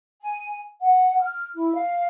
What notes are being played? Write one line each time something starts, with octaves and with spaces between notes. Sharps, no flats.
G#5
F#5
F6
E4
F5